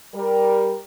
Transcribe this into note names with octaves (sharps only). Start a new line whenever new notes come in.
G3 A#4